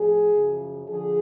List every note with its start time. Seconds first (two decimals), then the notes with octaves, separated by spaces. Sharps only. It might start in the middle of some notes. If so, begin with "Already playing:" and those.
Already playing: A2 F3 G#4
0.34 F#2 C#3 F3
0.88 D3 F3 G#4